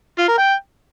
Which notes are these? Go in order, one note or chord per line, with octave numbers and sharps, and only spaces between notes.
F4
A#4
G5